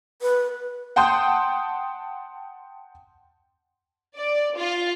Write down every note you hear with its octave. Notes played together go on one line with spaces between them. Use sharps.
B4
F#5 G5 A5 C6 D#6 G6
D5
F4